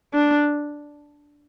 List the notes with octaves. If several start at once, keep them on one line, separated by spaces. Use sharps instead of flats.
D4